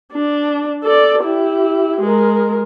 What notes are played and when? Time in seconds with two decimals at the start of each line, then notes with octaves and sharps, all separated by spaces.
0.12 D4
0.84 A4 D5
1.24 E4 G4
2.01 G#3 A#4